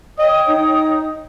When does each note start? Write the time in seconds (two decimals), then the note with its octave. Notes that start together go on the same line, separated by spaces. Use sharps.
0.19 C#5 D#5 G5 D#6
0.48 D#4